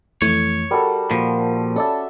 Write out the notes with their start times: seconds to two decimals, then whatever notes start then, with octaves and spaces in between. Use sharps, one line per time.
0.22 F2 E3 A3 C#5
0.71 G3 F#4 A4 A#4
1.11 A#2 F3
1.76 C#4 A4 D5 E5 A5